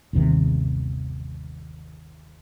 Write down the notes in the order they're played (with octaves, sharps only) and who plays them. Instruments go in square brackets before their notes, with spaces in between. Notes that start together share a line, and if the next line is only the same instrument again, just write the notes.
[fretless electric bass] G1 D#2 C3 D#3